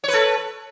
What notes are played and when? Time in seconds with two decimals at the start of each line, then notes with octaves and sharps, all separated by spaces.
0.04 C#5
0.08 B4
0.13 A4